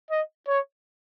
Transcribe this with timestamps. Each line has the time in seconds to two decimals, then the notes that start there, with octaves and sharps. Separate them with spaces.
0.11 D#5
0.48 C#5